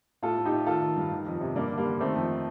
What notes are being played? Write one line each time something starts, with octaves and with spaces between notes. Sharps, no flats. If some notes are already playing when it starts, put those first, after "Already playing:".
A2 F4 A4
A2
D#4 G4
A2
D#3 F4 A4
D#3
G2
D#3
F2
C3
G2 A#3 D4
D3
G3 A#3
D3
D#3 A3 C4
F2